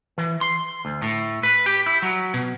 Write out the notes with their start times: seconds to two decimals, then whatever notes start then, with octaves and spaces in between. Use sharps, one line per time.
0.18 E3
0.41 C6
0.85 D2
1.02 A2
1.43 B4
1.66 G4
1.86 E4
2.02 F#3
2.34 B2